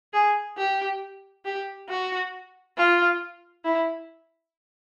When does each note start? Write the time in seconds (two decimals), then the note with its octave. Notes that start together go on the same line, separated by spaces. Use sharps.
0.13 G#4
0.58 G4
1.45 G4
1.89 F#4
2.77 F4
3.64 E4